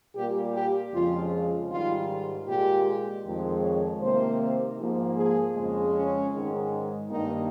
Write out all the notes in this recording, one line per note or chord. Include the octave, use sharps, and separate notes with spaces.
A#2 G3 A#3 G4
G4
F2 C#3 F3 G#3 F4
G#2 D#3 G3 F4
A#2 G#3 G4
F2 D#3 G#3
C#5
C3 D#3 A#3 C5
G#2 F3 A#3
G#4
F2 C#3 G#3
C#4
G#2 D#3 G#3
G2 D#3 A#3 D#4